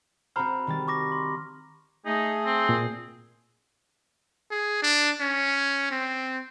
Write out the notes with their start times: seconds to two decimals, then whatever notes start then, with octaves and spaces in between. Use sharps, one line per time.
0.36 C4 F#4 C5 A#5 B5 F6
0.67 D#3 G3 A6
0.88 C#6 D6 A#6
1.12 C6
2.06 A3 D#4 G#4
2.46 C4
2.69 A#2
4.51 G#4
4.82 D4
5.20 C#4
5.91 C4